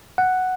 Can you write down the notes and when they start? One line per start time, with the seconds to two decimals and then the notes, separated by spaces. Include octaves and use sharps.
0.18 F#5